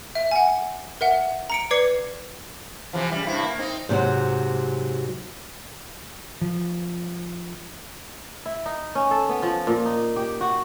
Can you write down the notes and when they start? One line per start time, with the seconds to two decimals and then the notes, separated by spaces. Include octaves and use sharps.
0.15 E5
0.31 F#5 G#5
1.01 A#4 E5 F#5
1.50 A#5 C#7 D7
1.71 B4 D5 D6 G#6 C7 C#7
2.93 C3 E3 F3
3.12 C#3 G3
3.27 G2 C3 E4
3.43 A#3
3.59 C4 D#4
3.89 G#2 C3 E3 F#3
6.42 F3
8.46 E4
8.66 D#4
8.95 C#4
9.11 A4
9.29 B3
9.43 F3
9.67 A#2
9.86 D#4
10.16 G4
10.41 F#4